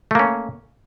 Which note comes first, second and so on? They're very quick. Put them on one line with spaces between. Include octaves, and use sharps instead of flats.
A3 A#3 C#4